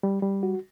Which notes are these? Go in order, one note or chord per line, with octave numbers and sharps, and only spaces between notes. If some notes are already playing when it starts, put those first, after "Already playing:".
G3
G3
F#4